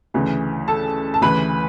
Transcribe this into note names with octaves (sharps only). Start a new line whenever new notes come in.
D2 C#3 E3
A4 A5
A5
D2 C#3 E3 B4 B5